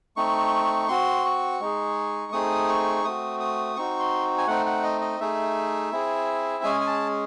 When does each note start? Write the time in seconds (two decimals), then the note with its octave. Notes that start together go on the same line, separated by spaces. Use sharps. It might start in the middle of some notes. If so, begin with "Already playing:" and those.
0.16 A3 C4 D#4 C#6
0.88 C4 F#4 C6
1.25 C#6
1.60 G#3 D#4 G#4
2.32 A3 C4 D#4 G#4 D#6
2.69 C#6
3.04 A3 C4 F#4 D#6
3.40 D#6
3.76 C4 D#4 F#4 C#6
3.99 C6
4.38 G#5
4.47 A3 C4 D#4 F#5
4.66 F#5
4.83 D#5
5.01 D#5
5.20 A3 D#4 G#4 E5
5.92 C4 E4 G#4
6.64 G#3 C#4 G#4 G#5
6.81 G#5
6.87 A5